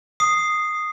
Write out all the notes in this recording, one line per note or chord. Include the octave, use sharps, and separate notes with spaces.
D#6 C7